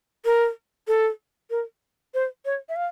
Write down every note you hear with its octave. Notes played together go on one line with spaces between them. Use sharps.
A#4
A4
A#4
C5
C#5
E5
F5